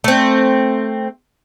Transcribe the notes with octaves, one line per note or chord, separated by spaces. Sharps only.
A3 C4